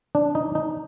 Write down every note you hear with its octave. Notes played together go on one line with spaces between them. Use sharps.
D4
D#4
D#4